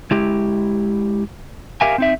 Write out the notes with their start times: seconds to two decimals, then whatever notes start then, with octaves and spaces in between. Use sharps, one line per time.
0.11 G#3 E4 G4
1.81 G4 A#4 E5 F5 G#5
1.98 C4 D#4 E5